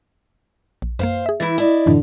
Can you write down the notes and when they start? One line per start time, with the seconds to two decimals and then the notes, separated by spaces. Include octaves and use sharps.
0.82 A#1
0.99 F#2 A#3 C5 F5
1.26 G#4 E5
1.40 E3 E4 A6
1.58 E4 D5 D#5
1.86 F#2 A2 D3 E3